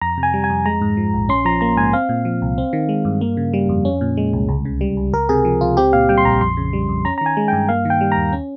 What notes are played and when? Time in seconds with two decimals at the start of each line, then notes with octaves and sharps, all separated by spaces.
0.01 F2 A#5
0.18 C3
0.23 G#5
0.34 G3
0.44 G#5
0.50 F2
0.66 G#3 A#5
0.81 G#2
0.97 F3
1.14 A#1
1.29 C#4 C6
1.45 F3 A#5
1.61 A#3 A#5
1.77 G#2 G#5
1.93 C4 F5
2.09 A#2
2.25 F3
2.42 C2
2.58 C4
2.73 D#3
2.89 G#3
3.05 G2
3.21 A#3
3.37 C#3
3.54 G3
3.69 F2
3.85 C#4
4.01 A#2
4.17 G#3
4.33 C2
4.49 C#2
4.65 C#3
4.81 G3
4.97 C#2
5.13 C#2 A#4
5.29 C3 G#4
5.45 F3
5.61 C#2 F4
5.77 C4 G4
5.93 A#2 F5
6.09 G3 G5
6.18 C6
6.25 A#1 A#5
6.41 F2 C6
6.57 C#3
6.73 G3
6.89 F2
7.05 C#4 A#5
7.18 A#5
7.21 D#3 G#5
7.37 G#3
7.48 G2 G5
7.69 A#3 F5
7.85 D#3 G5
8.01 G3
8.12 A#5
8.17 D#2
8.33 C#4